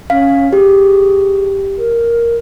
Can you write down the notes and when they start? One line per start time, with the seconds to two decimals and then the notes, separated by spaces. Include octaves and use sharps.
0.10 C#4 F5
0.53 G4 G#4
1.77 A#4